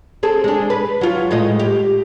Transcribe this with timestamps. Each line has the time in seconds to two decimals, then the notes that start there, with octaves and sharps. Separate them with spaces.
0.23 C4 G#4 A4
0.44 G#3 D4
0.70 B4
1.01 F#3 F4
1.31 A2 G#3 D#5
1.60 G4